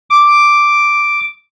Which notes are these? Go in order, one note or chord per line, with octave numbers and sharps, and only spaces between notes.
D6